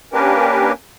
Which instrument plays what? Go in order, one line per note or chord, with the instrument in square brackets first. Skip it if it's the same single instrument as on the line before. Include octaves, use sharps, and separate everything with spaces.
[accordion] A#3 C#4 D4 G4 A#4 B4